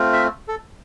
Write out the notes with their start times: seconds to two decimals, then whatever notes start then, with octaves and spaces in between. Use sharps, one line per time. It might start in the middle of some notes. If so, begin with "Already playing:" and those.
Already playing: A3 C4 F4
0.13 E5
0.48 A4